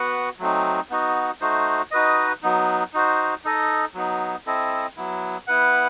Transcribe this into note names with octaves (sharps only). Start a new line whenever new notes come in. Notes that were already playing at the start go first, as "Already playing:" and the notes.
Already playing: B3 F#4 B4 F#5
F#3 A3 C4 D#4
B3 D#4 F#4
A3 D#4 F#4 C5
D#4 F#4 B4 D#5
F#3 B3 D#4
D#4 F#4 C5
D#4 A4 D#5
F#3 B3 D#4
C4 E4 A4 D#5
F#3 B3 E4
B3 E4 B4 F#5